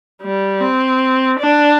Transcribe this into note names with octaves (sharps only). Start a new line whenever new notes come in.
G3
C4
D4